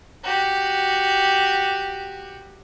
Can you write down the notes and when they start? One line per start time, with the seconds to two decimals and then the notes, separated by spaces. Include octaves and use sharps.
0.24 F#4 G4